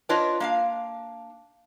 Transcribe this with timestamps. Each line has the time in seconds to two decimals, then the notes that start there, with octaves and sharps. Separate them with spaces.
0.09 D4 F4 B4 C#5 D#5
0.40 A#3 D4 F5